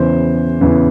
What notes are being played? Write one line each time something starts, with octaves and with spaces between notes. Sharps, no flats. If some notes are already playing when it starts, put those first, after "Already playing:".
Already playing: E2 C#3 E3 C5
E2 C#3 E3